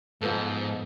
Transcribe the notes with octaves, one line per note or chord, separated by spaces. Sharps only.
G#2 F3 B3 A4